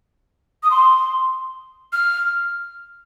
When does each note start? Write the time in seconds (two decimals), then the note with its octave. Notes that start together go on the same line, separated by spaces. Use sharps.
0.63 D#6
0.71 C6
1.93 F6